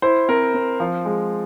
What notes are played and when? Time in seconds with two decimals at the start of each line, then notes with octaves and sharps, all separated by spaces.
0.02 E4 C5
0.28 C4 A#4
0.54 C4
0.80 F3
1.05 G#3